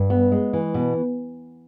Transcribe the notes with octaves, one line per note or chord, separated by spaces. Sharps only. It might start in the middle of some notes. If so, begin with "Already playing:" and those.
Already playing: G2
B3
G#3
E3
B2